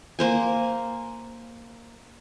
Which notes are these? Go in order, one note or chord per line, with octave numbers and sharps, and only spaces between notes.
A#3 C5 G#5